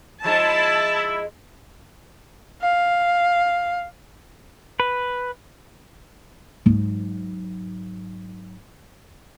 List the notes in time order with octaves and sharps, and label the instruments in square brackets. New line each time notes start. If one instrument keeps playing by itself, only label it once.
[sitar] F3 G#3 D#4 [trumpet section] E4 [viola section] A5
[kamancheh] F5
[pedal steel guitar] B4
[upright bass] G#2 F#3